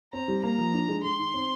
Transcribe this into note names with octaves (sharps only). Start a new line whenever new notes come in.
C4 A#5
G3
A#3 A#5
F3
D4
G#3
G#3 C6
D#3
C4